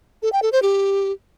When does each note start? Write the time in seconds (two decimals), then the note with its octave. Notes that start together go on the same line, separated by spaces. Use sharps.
0.22 A4
0.32 G5
0.42 A4
0.52 C5
0.62 G4